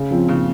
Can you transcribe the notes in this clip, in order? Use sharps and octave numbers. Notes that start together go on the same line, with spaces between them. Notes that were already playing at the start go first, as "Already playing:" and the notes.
Already playing: C#3
F3 C4
A#2 C#3